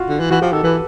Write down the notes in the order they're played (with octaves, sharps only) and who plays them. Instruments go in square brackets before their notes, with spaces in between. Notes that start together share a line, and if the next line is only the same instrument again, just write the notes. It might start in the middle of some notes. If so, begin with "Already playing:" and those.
Already playing: [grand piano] F4 F#4
[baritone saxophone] D3
E3
[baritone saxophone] E3 [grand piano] F#4
[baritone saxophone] F3 [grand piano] G4
[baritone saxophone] D#3 [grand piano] A4
[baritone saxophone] E3 [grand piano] B4